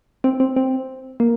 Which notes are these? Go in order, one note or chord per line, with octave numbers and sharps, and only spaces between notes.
C4
C4
C4
A#3